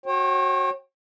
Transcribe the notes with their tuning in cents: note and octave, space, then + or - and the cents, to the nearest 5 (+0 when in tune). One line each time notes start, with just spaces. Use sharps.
F#4 +0 C#5 -40 G5 +0